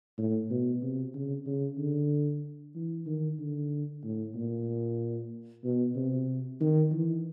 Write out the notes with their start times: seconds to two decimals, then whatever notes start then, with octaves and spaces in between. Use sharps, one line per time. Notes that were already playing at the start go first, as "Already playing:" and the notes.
0.18 A2
0.50 B2
0.82 C3
1.14 C#3
1.46 C#3
1.78 D3
2.75 E3
3.06 D#3
3.39 D3
4.04 A2
4.35 A#2
5.64 B2
5.96 C3
6.60 D#3
6.92 E3